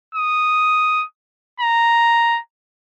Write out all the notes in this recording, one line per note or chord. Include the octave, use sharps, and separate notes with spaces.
D#6
A#5